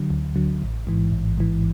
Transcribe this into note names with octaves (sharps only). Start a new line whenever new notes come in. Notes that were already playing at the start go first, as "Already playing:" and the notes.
Already playing: D3 F#3
D2
D3 F#3
A1
G#2 E3
A1
G#2 E3